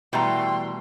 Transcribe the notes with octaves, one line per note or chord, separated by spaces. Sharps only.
B2 E3 G3 A3 G5 A#5 C6